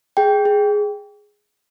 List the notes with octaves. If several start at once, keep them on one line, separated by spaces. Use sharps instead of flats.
G#4 G5
G#4